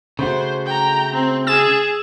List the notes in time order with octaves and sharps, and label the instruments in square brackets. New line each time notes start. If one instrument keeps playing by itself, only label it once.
[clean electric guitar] C#3 A3 F#4 [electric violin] C5
[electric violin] G5 A#5
C4
[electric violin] G#4 [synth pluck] E6 A6 E7